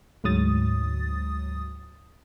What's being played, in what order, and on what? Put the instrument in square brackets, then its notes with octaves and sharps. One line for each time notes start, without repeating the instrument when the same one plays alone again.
[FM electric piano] D2 G#2 F#3 D#6 A6